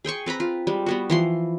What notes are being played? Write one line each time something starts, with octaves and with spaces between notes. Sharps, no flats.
G#4 G5 C6 C#6
C4 B4 A#5 B5
F4
G3 G#3
G3 B3 F#4
E3 F3 C6